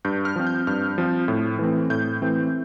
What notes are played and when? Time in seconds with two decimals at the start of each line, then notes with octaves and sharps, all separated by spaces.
0.05 G2 G6
0.25 F6
0.36 F3 C4
0.47 G6
0.67 G2 F6
0.98 F3 C4
1.28 A2
1.59 E3 A3 C4
1.90 A2 G6
2.22 E3 A3 C4